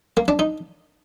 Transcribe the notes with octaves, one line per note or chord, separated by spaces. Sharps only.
A#3
D4
D#4